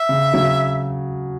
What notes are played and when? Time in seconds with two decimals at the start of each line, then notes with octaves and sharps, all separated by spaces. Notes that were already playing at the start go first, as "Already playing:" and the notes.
Already playing: E5
0.09 C#3
0.33 C#3 F#3